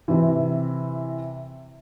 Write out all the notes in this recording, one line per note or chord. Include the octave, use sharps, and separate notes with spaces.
C3 E3